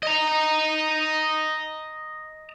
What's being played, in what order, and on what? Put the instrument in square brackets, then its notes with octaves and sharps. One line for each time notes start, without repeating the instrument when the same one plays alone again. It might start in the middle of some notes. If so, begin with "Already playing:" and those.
[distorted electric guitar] D#5 A#5